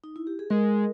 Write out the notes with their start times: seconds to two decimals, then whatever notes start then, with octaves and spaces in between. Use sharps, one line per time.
0.04 D#4
0.16 E4
0.27 G4
0.39 G#4
0.50 G#3 A#4